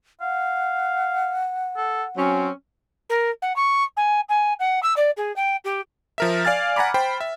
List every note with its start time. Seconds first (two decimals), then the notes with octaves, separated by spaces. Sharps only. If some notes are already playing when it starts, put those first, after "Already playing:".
0.21 F5 F#5
1.77 A4
2.17 F#3 C4 C#4
3.09 A#4
3.42 F#5
3.56 C#6
3.96 G#5
4.29 G#5
4.59 F#5
4.83 E6
4.96 D5
5.17 G#4
5.36 G5
5.64 G4
6.18 F3 A#4 E5
6.45 D5 F5 G#5 F6 A6
6.76 F#5 G#5 A#5 B5 D6
6.94 C5 G5 B5
7.21 E5